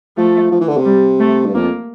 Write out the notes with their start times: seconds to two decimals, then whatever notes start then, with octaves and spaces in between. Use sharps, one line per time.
0.17 F3 A3
0.52 F3
0.60 E3
0.68 D3
0.77 C3
0.85 G3
1.20 A3
1.46 G2
1.54 F2 A#3